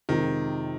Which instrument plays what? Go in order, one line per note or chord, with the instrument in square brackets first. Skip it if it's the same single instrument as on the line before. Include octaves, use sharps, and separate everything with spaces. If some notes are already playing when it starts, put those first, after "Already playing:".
[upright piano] F2 C3 F3 G#3 [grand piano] D#3